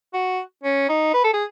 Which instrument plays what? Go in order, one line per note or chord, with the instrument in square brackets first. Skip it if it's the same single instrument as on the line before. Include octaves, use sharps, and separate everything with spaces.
[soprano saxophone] F#4
C#4
D#4
B4
A4
G#4